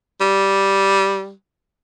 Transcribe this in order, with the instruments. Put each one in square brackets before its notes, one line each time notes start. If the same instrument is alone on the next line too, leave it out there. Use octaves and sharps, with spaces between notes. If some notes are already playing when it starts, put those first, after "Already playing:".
[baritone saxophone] G3